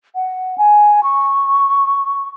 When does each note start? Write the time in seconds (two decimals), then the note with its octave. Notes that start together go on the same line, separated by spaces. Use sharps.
0.15 F#5
0.58 G#5
1.03 C#6